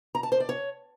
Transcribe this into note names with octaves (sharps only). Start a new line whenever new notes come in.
A#5
A5
C5
D5
C#5